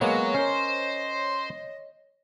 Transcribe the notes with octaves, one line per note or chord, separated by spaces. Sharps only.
F#3 G#3 A#3 B3 C#5 D#5
C#4 A#4 C5